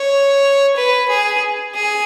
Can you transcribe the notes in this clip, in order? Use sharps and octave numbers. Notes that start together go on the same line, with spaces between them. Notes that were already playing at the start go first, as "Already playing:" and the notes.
Already playing: C#5
B4
G#4
G#4